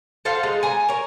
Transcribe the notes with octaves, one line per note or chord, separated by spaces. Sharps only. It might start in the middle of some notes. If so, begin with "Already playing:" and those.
A4 C5 F5 F#5
G#3 D#4
G#5 A#5
A#4 C#5